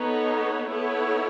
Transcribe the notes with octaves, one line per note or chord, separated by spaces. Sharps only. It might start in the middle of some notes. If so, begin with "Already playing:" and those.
Already playing: B3 D#4 A4 C#5
B3 E4 A4 C#5